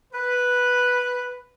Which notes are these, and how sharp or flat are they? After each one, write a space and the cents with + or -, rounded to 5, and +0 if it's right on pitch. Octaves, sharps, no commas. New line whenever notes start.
B4 -5